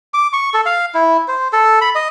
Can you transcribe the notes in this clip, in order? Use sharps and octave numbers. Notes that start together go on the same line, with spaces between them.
D6
C#6
A4
F5
E4
C5
A4
B5
D#5